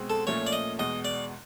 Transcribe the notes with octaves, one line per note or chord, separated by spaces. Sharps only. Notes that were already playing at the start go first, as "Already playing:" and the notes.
Already playing: B2 G#3 C4
A4
A#2 F3 A3 C#4 C#5
D5
D#5
E2 B2 G#3 D#5
D5